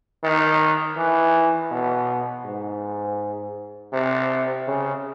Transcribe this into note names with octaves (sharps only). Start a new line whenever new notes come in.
D#3
E3
B2
G#2
C3
C#3